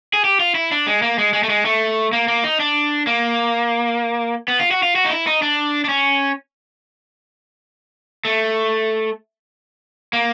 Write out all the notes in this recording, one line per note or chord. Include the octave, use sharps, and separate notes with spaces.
G#4
G4
F4
E4
D4
G#3
A#3
G#3
G#3
A3
G#3
A3
A#3
A#3
D#4
D4
A#3
B3
F4
F#4
F4
F#4
D#4
E4
D#4
D4
D4
C#4
A3
A#3